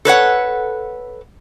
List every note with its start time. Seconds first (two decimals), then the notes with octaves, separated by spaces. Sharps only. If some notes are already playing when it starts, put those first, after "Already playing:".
0.05 A4 B4 C#5 F#5